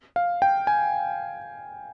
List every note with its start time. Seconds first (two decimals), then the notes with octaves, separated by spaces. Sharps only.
0.16 F5
0.42 G5
0.67 G#5